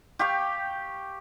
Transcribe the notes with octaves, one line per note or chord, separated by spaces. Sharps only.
G4 F5 G5 C#6